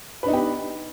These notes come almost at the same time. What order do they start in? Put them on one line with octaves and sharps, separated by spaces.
B4 D4 D#4 B3 G4